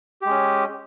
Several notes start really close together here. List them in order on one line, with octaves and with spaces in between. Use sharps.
G4 G#3 C#4